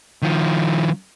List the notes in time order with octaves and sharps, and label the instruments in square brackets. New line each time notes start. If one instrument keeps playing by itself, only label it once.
[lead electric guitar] D#3 F3